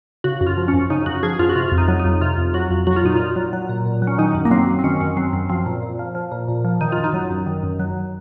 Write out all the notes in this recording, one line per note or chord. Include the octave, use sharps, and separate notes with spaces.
C#3 F#4
F#2
F4
F3
C#4
F#2
C#3 D#4
F#2 F#4
F3 G#4
F#2 F4
F#4
C3 F4
F2 F4
D#4
F#3
D#4
F2
C3 F4
F2
F#3 F#4
F2
F#3 F#4
F4
A#2 D#4
A#2 F4
F#3
F#3
A#2
A#2
F#3
C#4
D#3 D#4
F#2
A#3
F#3 C4
F#2
C4
D#3 C#4
F#2 C#4
F#3 C4
F#2 C4
F3 C4
A#2
A#2
F3
F3
A#2
A#2
F3
D#3 D#4
F#2 F4
D#4
F#3
F#2
D#3
F#2
F#3